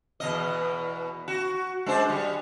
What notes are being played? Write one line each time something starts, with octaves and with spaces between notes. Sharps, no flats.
E2 B2 D#5
F#4
G#3 D4 C5
G3